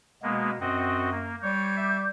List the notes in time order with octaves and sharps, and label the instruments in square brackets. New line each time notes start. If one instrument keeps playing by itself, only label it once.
[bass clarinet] B2 [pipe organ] G#3 A#3 B3
[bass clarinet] F#2 [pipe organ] C4 F#4 D#5
[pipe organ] A#3
[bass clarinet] G3 [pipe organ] C#5 [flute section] D6 G6
[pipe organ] E5